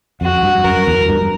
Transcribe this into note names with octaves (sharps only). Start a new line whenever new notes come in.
F2 F#4
G2
F#2 A#4
E2
G2